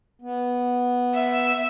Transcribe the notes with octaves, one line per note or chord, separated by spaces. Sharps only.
B3
E5